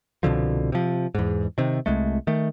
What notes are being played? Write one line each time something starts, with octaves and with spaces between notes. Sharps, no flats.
C2 B2 D3 F3
C3 F3
E2 G#2
C3 D#3
C2 G#3 A3
D#3 A3